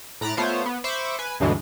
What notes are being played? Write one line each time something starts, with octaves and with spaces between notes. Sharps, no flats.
A2 A#5 B5 F#6 A6 D7
A3 B3 F4 C5 C#5
B3
C5 E5 B5 C#6 D6
B4 G#5
D2 G2 B2 D3 E3 G#3